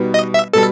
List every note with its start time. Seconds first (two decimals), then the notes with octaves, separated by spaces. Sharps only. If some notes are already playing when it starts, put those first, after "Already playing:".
Already playing: B2 G3 B3 D#4
0.14 D#5
0.34 E5
0.53 B2 G3 A4